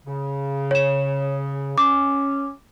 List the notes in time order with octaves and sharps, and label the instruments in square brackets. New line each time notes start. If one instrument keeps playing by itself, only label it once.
[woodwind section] C#3
[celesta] C#5 E7
[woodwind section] C#4 [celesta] D6